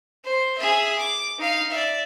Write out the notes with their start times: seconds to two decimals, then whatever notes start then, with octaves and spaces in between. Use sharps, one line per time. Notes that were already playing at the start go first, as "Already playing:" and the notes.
0.24 C5
0.58 G#4 E5
0.98 D6
1.38 D#4 F5
1.71 D5 E5